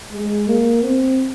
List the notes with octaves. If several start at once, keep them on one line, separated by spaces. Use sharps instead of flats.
G#3
A#3
C4